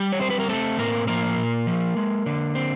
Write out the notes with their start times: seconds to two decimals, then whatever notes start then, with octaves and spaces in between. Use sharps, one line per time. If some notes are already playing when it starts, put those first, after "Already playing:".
Already playing: G3 G4
0.12 C#5
0.20 C4 C5
0.30 B4
0.40 A#4
0.49 A3 C4 A4
0.78 A2 A#3 A#4
1.08 F3 A#3 A#4
1.37 A#2
1.67 F3
1.97 G#3
2.26 D3
2.55 C4